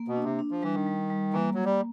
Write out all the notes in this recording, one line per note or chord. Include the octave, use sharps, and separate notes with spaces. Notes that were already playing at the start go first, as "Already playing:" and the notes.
Already playing: A#3
B2
D4
C3
D4
F3
E3 G3
D#3
G3
G3
E3 A#3
F#3 A#3
G3